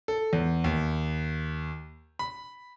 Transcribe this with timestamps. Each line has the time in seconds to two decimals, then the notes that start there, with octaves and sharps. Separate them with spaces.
0.08 A4
0.33 E2
0.64 D#2
2.19 B5